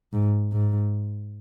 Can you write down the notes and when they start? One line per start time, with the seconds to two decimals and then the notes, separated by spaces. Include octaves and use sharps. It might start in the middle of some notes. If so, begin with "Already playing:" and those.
0.13 G#2
0.53 G#2